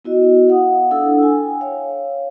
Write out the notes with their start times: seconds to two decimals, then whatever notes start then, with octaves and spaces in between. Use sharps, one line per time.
0.05 B3 E4 F#4 D#5
0.48 F5 F#5 D#6
0.91 D4 E4 A4 F#5 E6
1.19 G5 G#5
1.61 C#5 F5